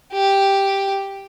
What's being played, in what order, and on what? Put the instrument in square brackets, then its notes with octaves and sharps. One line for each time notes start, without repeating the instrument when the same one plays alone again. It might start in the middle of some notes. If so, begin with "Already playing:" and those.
[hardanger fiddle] G4